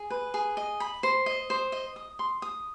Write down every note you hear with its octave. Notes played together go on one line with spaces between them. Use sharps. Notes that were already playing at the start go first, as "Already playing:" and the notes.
Already playing: G#4
B4
G#4
D#5
B5
C5
D#5
C5
D#5
D#6
C6
D#6